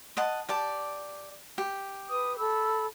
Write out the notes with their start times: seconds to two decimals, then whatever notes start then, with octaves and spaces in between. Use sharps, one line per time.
0.17 D#5 F#5 A5
0.49 G4 D5 A5
1.58 G4
2.09 B4 D#6
2.38 A4 B5 E6